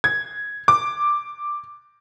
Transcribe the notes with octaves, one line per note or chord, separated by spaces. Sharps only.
G#6
D6